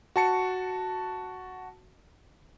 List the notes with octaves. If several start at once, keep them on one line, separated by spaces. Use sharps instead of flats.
F#4 A5 C#7